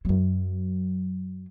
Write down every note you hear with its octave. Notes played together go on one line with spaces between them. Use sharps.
F#2 F#3